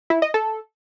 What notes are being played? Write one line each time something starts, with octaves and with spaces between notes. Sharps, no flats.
E4
D#5
A4